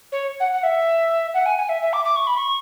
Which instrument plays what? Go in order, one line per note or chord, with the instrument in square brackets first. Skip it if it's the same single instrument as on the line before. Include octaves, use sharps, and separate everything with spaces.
[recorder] C#5
F#5
F#5
E5
F#5
G#5
G#5
E5
E5
D6
D6
C#6
B5
C#6